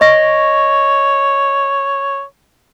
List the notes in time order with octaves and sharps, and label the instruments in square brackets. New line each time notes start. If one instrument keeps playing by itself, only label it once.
[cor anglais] C#5 [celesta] D#5 C#6 A#6